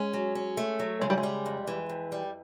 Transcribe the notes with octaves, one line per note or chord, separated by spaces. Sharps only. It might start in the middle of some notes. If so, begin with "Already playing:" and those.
Already playing: G#3 C#4
F#3
C#4
A3
F#3
C#3 G#3
G3
G#3
G3
F2
E3
F2
G3